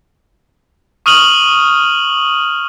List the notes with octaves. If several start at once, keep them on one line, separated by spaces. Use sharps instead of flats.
C#6 D#6 F6 D#7 F7 F#7